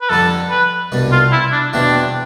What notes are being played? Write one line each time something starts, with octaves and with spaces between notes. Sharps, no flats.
B4
F2 D3 G3 D4 A4
B4
C2 B2 G3 D4
F4
E4
D4
E2 B2 G3 C4 D4 E4